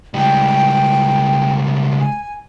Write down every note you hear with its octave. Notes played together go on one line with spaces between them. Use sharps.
C#2 G3 G5
G#5